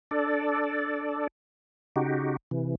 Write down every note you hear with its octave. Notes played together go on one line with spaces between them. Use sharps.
D4 A4 D5
C#3 D#4 F#4 G4
C3 E3